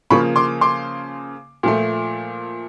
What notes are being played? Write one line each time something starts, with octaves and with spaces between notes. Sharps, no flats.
C#3 F3 A#3 B5 C#6
C6 D6
C6 D6
A#2 F3 A3